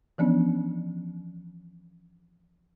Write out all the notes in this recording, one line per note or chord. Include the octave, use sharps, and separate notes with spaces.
E3 F3 B3 C#4 D4